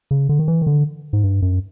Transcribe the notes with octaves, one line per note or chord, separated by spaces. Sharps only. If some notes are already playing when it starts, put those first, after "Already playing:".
C#3
D3
D#3
E3
D#3
D3
G#2
G2
F#2